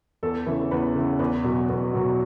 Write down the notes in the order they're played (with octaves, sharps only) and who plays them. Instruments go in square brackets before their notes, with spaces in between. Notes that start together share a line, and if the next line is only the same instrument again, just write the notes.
[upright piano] E2 A4
C#3 E3
E2 B4
C#3 E3
E2 B4
B2 F#3
E2
B2 F#3